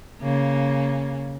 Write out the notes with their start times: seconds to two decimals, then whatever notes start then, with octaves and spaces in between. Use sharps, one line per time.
0.21 C#3 A#3